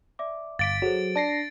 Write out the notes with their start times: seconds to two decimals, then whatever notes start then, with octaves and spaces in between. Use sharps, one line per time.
0.19 D5 E5 D6
0.59 G1 F5 D6 A6 B6 D7
0.82 F#3 G#4 A4 C5
1.16 D4 D5 A5 A#6 C7